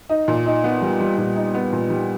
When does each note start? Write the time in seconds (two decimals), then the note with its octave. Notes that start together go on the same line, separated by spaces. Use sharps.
0.09 D#4
0.28 A#2
0.46 D#4
0.64 B3
0.82 G3
1.00 G3
1.18 A#2
1.36 D#4
1.54 B3
1.73 A#2
1.90 G3